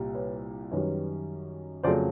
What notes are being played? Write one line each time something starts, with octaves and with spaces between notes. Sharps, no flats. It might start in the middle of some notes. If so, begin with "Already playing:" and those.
Already playing: C2 A#2 G3
B4 C#5
F#2 D#3 G3 B4 C#5
F2 C#3 F#3 A3 C5 D5